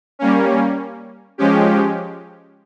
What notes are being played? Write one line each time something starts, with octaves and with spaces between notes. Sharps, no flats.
G3 A#3 C#4
F3 G#3 C#4 G4